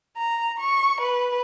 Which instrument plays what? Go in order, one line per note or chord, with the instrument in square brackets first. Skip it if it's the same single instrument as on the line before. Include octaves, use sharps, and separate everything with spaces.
[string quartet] A#5
C#6
B4